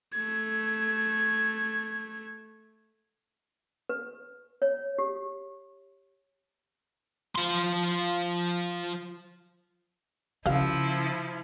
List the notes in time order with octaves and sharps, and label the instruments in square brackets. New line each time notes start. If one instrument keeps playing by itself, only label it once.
[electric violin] A3 G#6
[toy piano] B4
C#5
G4
[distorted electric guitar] F3 C6
[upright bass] C#3 [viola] F3 E4 [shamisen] F#4 A#4 F5